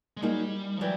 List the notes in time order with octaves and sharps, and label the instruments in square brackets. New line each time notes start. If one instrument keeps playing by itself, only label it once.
[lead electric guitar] G#3
[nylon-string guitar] F#3 A#3 D#4 G#4 [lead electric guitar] G3
[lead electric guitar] F3
[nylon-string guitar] E3 G3 [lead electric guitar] F#3